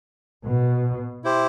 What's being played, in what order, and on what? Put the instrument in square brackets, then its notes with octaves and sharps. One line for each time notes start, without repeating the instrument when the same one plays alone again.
[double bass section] B2
[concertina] E4 G4 C5